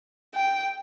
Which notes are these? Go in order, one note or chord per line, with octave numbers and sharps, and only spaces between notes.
G5